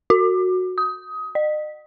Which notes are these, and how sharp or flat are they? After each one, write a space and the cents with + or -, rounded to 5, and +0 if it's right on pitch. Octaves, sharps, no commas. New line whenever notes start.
F#4 -10
D#6 +20
D#5 -40